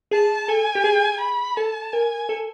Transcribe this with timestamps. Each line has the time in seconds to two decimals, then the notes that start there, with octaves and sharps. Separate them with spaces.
0.11 G#4 A5
0.48 A4 G#5
0.75 G4
0.84 G#4
1.20 B5
1.57 A4 A5
1.93 A#4 G#5
2.29 A4